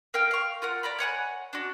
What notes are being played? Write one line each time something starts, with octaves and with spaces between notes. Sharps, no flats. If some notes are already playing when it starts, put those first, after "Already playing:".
A#4 F5 G5 F6
F5 C#6
F4 A#4 F#5
D5 A#5 B5
C#5 F#5 G#5 F#6
D4 F#4